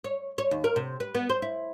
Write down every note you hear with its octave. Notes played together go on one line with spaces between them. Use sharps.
C#5
C#5
D#2
A#4
C3
B4
B3
C5
E4